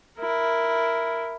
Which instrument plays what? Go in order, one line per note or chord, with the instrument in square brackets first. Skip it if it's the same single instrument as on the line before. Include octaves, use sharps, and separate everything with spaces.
[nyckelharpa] E4 A#4